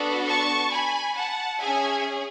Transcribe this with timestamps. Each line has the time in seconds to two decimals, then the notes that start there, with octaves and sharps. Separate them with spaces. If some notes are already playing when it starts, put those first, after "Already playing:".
Already playing: B3 D4 F#4 A4
0.27 A5 C#6
0.71 G#5 B5
1.16 F#5 A5
1.60 C#4 G#4 E5 G#5